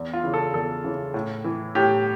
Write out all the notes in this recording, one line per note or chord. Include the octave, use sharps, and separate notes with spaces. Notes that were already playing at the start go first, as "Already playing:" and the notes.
Already playing: E2
F4
C#3 E3
A4
E2 A4
C#3 E3
A2
E3
A2 G4